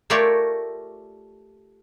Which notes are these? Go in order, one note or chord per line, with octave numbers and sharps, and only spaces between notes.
A3 F4 G4 A#4 C#5 D5